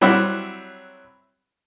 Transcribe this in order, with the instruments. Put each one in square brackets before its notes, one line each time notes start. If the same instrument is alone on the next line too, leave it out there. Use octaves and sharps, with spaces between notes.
[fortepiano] F#3 G3 C4 E4 F#4